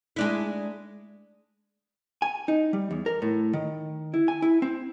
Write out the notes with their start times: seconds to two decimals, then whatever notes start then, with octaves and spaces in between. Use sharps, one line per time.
0.16 G#3 D4 E4
2.22 G#5
2.48 D#4
2.73 G3
2.91 E2
3.06 A#4
3.22 A2
3.53 D#3
4.14 E4
4.28 G#5
4.42 E4
4.62 C4